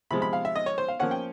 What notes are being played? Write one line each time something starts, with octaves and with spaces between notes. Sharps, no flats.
C3 F3 G#3 B5
B5
F5
E5
D#5
C#5
C5
F5
F3 A#3 C#4 F#5
G5